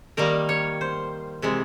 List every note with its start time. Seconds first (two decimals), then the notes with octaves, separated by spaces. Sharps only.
0.17 D#3 G3 A#3 A#4
0.49 C#5
0.81 C5
1.42 C3 E3 G#3